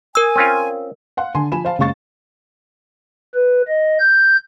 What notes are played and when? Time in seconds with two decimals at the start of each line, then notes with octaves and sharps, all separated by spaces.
0.15 A#4 G#5 E6
0.36 C4 C#4 F4
1.17 F5 F#5 C6
1.35 D3 G#5 C6
1.52 F3 G#5 B5 E7
1.65 C5 F5 A5
1.78 F#1 C#3 G#3 F5 C#6 A6
3.35 B4
3.68 D#5
4.00 G6